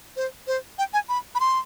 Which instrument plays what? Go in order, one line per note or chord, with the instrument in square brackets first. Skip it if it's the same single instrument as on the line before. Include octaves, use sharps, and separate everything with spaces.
[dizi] C5
C5
G5
G#5
B5
B5
C6